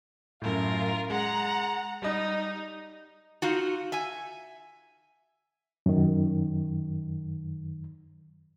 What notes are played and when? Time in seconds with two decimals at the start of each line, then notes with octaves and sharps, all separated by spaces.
0.42 F#2 A2 F4 A#4
1.10 G#3 F#5 A#5
2.02 G3 D#4 D#5
3.42 D#4 F4 F#4
3.92 E5 G#5
5.86 F#2 D#3